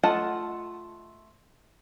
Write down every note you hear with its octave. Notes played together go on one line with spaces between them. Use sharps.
A3 F4 D#5 F#5 A5